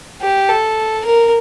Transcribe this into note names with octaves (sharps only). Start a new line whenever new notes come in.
G4
A4
A#4